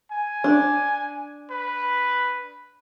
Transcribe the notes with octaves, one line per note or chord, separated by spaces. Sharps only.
G#5
D4
B4